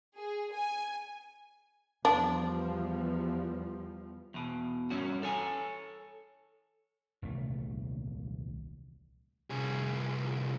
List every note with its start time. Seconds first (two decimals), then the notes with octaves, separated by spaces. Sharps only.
0.15 G#4
0.53 G#5
2.05 E2 F3 G3 D4
4.34 E2 B2
4.90 G2 C#4 F#4
5.23 A4 C#5 G#5
7.22 D#1 C2 E3 A3
9.50 C2 G#4